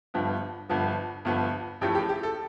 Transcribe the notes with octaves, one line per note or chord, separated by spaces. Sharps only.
G1 G2 F3 B3
G1 G2 F3 B3
G1 G2 F3 B3
A1 A2 F3 A3 G4
G4
G4
A4